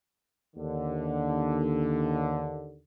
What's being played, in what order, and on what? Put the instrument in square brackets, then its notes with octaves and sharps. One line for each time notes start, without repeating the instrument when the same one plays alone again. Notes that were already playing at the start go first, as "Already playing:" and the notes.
[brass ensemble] D#2 D3